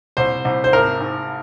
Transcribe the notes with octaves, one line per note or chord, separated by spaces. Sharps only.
C2 C5
C2
C5
G#1 A#4
G#2